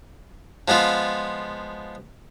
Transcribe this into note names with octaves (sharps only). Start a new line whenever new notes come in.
F3 G#3 B3 F4